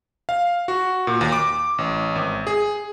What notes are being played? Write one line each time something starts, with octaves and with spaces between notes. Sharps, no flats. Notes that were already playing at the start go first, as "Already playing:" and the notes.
F5
F#4
A#2
D#2
D6
A1
G#1
G#4